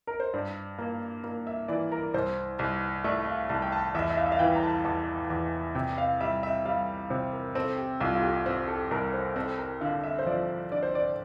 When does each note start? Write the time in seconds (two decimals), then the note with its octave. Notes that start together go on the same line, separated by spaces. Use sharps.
0.07 A#4
0.20 C5
0.33 G2 D5
0.78 A#3
1.24 A#3
1.47 E5
1.68 E3 D5
1.92 A#4
2.14 C2 C5
2.59 C2
3.04 A3 D5
3.22 E5
3.27 F5
3.49 C2 A5
3.62 G5
3.72 A5
3.94 E2 E5
4.10 E5
4.17 F5
4.26 E5
4.32 F5
4.39 E3 G5
4.55 A#5
4.63 A5
4.84 E2 A5
5.30 E2
5.75 C3 G5
5.98 F5
6.20 G3 E5
6.43 E5
6.65 G3 F5
7.10 C3 C5
7.33 A#4
7.55 C4 A4
7.78 G4
8.00 C2 F4
8.15 F4
8.23 G4
8.46 C4
8.68 A4
8.91 C2 A#4
9.14 C5
9.36 C4 A4
9.58 A#4
9.81 D3 F5
10.04 E5
10.19 C5
10.26 F3 D5
10.72 D3 D5
10.83 C5
10.95 D5